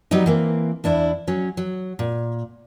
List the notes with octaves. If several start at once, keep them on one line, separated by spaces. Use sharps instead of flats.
F#3 G3 B3 D#4
E3 A#3 C4
E2 D4 E4
F#3 C#4
F#3
A#2